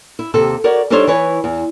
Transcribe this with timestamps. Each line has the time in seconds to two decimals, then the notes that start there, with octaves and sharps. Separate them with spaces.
0.19 E4
0.34 D#2 C3 A4
0.64 F#4 A#4 C#5 D5
0.90 G3 D4 D#4 A4 C5 C#5
1.08 E3 B4 C#5
1.44 E2